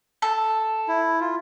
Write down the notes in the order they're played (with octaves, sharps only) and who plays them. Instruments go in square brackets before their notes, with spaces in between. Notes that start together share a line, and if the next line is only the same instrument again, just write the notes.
[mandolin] A4
[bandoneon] E4
F4